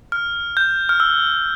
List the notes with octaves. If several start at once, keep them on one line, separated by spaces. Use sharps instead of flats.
F6
G6
F6
E6